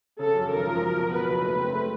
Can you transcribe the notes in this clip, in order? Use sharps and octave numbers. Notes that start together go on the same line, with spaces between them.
C#3 A4
F#2
G#1 A#4
F3
F#3
B2
F#3 B4
F#1
A3
C4
A3